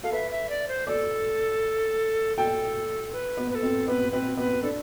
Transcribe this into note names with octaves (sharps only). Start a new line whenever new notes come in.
A4 F5
B4 E5
E5
D5
C5
A4 D5
A4 G5
B4
B3
B4
A4
C4
B3 B4
C4 B4
B3 B4
D4 A4